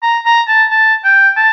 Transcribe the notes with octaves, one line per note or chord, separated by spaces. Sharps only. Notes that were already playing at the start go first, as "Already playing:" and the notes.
A#5
A#5
A5
A5
G5
A5